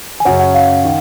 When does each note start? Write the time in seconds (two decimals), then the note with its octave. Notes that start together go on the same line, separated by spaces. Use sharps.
0.20 G#5
0.25 F#2 C#3 F#3 C#4 F#5
0.39 F#5
0.54 F5
0.85 D#3